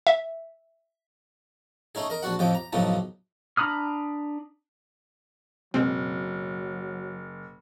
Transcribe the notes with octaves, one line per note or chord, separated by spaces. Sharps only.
E5
A3 C#4 D#4 G#4
A#4 D#5
A#1 D4 F#4 F#5
F2 A2 F3 G4 D#5
A#5
B1 F#2 A2 C#3 F3 D#4
D4 A#5 B5 D#6 F6
F#1 B2 F#3 G#3 C4